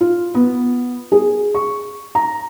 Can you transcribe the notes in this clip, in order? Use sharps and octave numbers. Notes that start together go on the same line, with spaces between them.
F4
B3
G#4
C#6
A#5